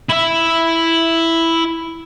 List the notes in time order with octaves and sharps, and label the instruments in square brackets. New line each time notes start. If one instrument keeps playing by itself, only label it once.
[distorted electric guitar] E4 E5